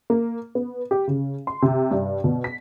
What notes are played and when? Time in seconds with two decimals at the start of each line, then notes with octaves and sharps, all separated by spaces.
0.10 A#3
0.55 B3
0.91 G4
1.07 C#3
1.47 C6
1.62 C3
1.91 G2
2.24 B2
2.44 B6